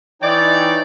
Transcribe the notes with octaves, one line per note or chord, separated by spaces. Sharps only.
E3 D#4 C#5 D5 G5